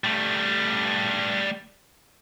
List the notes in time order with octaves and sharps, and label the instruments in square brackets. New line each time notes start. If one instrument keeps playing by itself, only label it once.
[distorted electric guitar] G3 A3